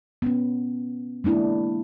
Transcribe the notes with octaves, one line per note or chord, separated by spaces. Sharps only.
B3 C#4
G#3 A#3 D4 E4